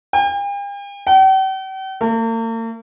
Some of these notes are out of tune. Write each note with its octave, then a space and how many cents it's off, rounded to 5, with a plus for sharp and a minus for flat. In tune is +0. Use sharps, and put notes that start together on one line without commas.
G5 +45
G5 -45
A#3 -45